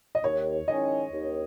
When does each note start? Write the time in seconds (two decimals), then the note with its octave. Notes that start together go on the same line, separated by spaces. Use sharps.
0.15 D#5
0.23 D#2 C#5
0.68 D#3 G#3 C#4 E4 D#5
1.12 D#2